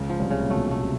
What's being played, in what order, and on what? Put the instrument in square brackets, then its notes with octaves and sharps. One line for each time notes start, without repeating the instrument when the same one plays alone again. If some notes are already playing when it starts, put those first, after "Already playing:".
Already playing: [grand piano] C#2 C#3
[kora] F3
[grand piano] C2 C3
[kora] C#3
[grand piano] A#2
[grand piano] B1 B2 [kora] A3
[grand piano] B2 [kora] A3
[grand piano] C3